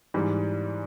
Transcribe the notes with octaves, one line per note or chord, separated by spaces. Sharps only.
G#2 E3 G3